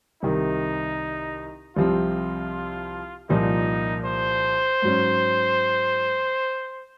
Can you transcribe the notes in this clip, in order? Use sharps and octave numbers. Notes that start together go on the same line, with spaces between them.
C2 C3 D#3 D#4
C2 C3 F3 C4 F4
C2 A#2 F3 A#3 D#4
C5
G#2 F#3 C#4